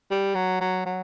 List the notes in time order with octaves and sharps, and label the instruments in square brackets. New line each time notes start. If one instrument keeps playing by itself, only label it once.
[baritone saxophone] G3
F#3
F#3
F#3